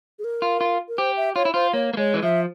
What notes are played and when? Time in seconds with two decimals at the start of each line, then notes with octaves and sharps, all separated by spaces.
0.19 G#4
0.24 A#4
0.42 F4
0.61 F4
0.88 A#4
0.98 G4 C5
1.17 E5
1.36 F4 C#5
1.45 E4
1.54 F4 C5
1.73 A#3 C#5
1.94 A#3
1.97 G#3 C#5
2.14 E3
2.23 F3 E5